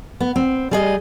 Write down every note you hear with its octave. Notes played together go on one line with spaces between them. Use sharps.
B3
C4
G3 G#4 D#5